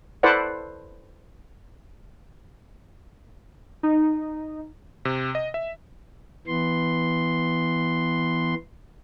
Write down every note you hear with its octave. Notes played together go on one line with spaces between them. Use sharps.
E4 A4 B4 C5 D5 F#5
D#4
C3
D#5
E5
E3 B3 C6